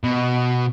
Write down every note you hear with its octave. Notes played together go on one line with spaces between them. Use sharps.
B2